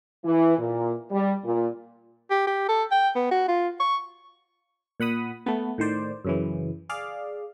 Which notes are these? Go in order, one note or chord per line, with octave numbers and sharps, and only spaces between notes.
E3
A#2
G3
A#2
G4
G4
A4
G5
B3
F#4
F4
C#6
A#2 F#5 B5 D#6
A3 B3
A2 D#3 C5 D5
F#2 C#3 E3
G#4 D5 F5